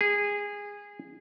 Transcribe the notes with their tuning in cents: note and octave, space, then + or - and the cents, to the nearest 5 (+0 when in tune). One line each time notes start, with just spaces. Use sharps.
G#4 -20